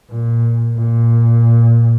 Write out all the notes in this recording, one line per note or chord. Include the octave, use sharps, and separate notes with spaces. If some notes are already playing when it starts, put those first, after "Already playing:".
A#2
A#2